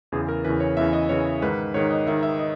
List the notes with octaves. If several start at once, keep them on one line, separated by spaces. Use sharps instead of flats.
E2 C#3 E3 G#4
A#4
E2 C#3 E3 B4
C#5
E2 C#3 E3 E5
D#5
E2 C#3 E3 C#5
G#2 D#3 B4
G#2 D#3 C#5
D#5
G#2 D#3 E5
E5
D#5